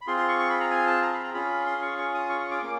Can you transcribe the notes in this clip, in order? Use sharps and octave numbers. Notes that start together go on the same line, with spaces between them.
B5
C4 F4 G#4 C6
C6
C#6
C#6
B5
A#5
G#5
A5
A#5
B5
A#5
C#4 F4 G#4 B5
C6
C#6
C#6
D#6
C#6
C#6
D6
A#3 C#4 D6